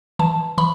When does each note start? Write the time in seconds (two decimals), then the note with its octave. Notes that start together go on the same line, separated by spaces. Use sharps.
0.19 E3 A5
0.58 E3 B5